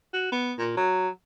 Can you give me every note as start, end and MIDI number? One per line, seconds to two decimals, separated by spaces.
0.14 0.32 66
0.32 0.53 59
0.59 0.74 46
0.77 1.08 54